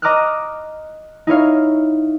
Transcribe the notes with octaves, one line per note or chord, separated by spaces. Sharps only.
D#5 A#5 D6 D#6 F6 F#6
D#4 E4 C#5 F5